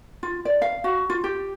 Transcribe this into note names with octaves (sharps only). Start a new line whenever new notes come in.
F4
D5
F5
F#4
F4
G4